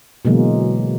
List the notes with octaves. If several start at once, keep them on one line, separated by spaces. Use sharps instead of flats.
B2 D3 E3 F#3 G#3 A#3